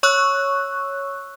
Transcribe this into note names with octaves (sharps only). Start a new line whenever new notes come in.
C#5 C#6 E6 F#6